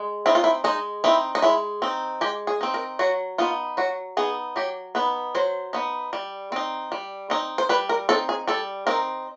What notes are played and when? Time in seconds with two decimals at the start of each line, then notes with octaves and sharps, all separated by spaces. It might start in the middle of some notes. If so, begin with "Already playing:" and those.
Already playing: G#3
0.26 C4 D#4 E4
0.35 F4
0.44 E4
0.64 G#3 D#4
1.04 C4 D#4 E4
1.35 D#4
1.42 G#3 E4
1.82 C4 D#4
2.21 G#3 G4
2.47 G#4
2.61 C4 D#4
2.74 A#4
2.99 F#3 F#4
3.38 B3 D#4 F4
3.77 F#3 F#4
4.17 B3 D#4 G#4
4.56 F#3 G4
4.95 B3 D#4 B4
5.35 F#3 C5
5.73 B3 D#4
6.13 G3
6.52 C4 D#4
6.92 G3
7.30 C4 D#4
7.58 C5
7.69 G3 B4
7.89 A#4
8.09 C4 D#4 A4
8.29 G#4
8.48 G3 A4
8.87 C4 D#4 A#4